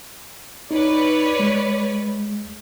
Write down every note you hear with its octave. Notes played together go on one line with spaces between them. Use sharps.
D#4 B4 C#5 D5
G#3